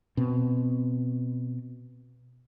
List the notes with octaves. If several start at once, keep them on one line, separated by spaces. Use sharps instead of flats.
B2 C4